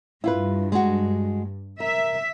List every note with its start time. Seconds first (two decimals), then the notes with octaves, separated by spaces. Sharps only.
0.24 G2 E4 F4 B4
0.72 G#3 F#4
1.80 A#4 E5